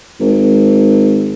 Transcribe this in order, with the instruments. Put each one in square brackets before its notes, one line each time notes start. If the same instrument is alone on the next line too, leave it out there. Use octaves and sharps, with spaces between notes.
[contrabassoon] G#1